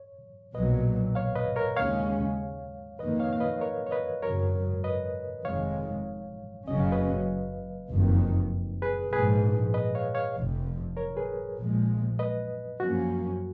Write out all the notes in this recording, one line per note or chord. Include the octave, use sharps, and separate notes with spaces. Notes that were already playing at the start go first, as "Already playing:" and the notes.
Already playing: C#5
B1 A#2 F#3 B4 D#5
C#5 F5
B4 D#5
A#4 C#5
D#2 C#3 G#3 C#4 C#5 F5
F2 D#3 A#3 B4 D#5
C#5 F5
F5
B4 D#5
A#4 C#5
C#5
B4 D#5
G#1 F#2 C#3 F#3 A#4 C#5
B4 D#5
F1 F2 D#3 G#3 C#5 F5
F#1 F#2 C#3 F#3 C#4 D#5
F5
B4 D#5
F#1 F2 D#3
G#4 B4
A#1 G#2 F3 G#4 B4
B4 D#5
C#5 F5
C#5 F5
F1 F2 F3
A#4 C#5
G#4 B4
A#1 A#2 F3 G#3
B4 D#5
F#2 F3 A#3 C#4 F#4